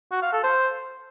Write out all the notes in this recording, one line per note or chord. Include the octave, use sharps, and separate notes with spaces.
F#4
F5
A4
C5